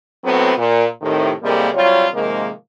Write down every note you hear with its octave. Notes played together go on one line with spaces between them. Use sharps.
A2 F#3 A3 B3 C4
A#2
A2 C3 D#3
A2 C3 G3 G#3 A#3
C3 F#3 G3 F4 C#5
G#2 C3 D#3 F3 G#3 A#3